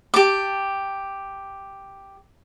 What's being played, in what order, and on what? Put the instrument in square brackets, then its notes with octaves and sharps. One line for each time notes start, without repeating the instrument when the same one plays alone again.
[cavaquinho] G4 A5 D6